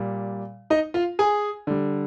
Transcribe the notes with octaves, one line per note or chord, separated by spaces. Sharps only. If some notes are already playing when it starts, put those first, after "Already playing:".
Already playing: A#2 G3
D#4 D#5
F4 F5
G#4 G#5
D3 G3